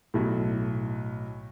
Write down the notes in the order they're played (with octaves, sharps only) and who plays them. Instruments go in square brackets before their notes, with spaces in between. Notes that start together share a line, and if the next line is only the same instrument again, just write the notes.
[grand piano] B1 A2